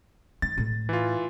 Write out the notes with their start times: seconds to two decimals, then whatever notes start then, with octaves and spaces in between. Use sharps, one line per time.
0.42 D#3 A6
0.58 A2
0.89 E3 F4